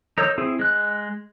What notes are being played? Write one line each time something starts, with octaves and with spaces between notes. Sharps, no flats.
D#4 A#4 C#5 E6 G6
C4 E4 G#4
G#3 F#6